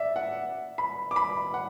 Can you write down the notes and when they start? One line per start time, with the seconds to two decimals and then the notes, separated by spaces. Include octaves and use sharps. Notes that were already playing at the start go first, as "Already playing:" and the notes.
Already playing: D5 E5
0.16 F#5
0.78 B5
1.11 D6
1.16 B5
1.54 F#5